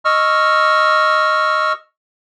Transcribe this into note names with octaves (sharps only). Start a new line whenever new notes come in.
D#5 C#6 E6 F6